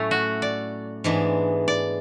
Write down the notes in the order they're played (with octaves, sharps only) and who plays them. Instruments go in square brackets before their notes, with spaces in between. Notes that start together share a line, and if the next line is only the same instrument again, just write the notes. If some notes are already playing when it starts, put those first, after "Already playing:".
Already playing: [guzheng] A2 F#3 C#4 [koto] A3
[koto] F#4
D5
[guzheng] G#2 E3 G#3 B3 D4
[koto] D5